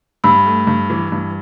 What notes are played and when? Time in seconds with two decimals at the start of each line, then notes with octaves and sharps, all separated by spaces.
0.24 G2 B5 E6
0.46 A3
0.67 G2
0.90 E3
1.12 G2